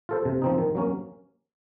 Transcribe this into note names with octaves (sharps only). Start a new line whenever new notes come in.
F4 A4 C5
C3
F3 C4 D#4
D#3
F#3 A#3 C#4